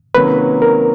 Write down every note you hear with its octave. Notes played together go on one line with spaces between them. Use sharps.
C3 D#3 F#3 A#3 C#4 B4
A#4